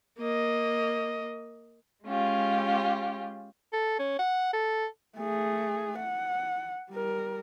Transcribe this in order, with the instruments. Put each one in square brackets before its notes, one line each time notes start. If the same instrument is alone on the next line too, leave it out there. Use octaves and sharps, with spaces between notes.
[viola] A#3 D#5
[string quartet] G#3 C#4 F4 G4
[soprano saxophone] A4
C#4
F#5
A4
[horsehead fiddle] A3 G#4
F#5
G3 A#4